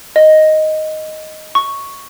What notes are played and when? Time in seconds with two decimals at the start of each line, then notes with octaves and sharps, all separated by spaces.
0.16 D#5
1.55 C#6